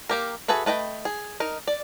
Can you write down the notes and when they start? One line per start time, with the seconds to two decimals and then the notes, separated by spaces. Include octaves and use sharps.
0.09 A#3 G4 A#4
0.48 F#4 G#4 A4 B4 E5
0.66 A3 B4 D#5 G5
1.05 G#4
1.40 D#4 A#4
1.67 D5